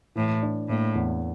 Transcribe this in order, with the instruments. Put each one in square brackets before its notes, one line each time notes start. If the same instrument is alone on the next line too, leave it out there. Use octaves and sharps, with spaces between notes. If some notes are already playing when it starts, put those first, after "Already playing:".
[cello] A2 [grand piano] E3
[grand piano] D4
[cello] A2 [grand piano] A#3
[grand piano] E2